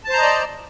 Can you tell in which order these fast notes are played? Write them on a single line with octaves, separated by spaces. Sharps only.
A5 C5 A#5 D#5 D5